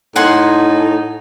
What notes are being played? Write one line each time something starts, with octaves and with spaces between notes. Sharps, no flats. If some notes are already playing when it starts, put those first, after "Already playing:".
A2 D#4 F#5 G#5 C6